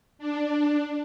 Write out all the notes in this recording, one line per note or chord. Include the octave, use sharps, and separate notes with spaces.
D4